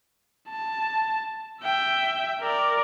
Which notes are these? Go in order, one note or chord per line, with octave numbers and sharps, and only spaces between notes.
A5
E5 G5
A#4 D5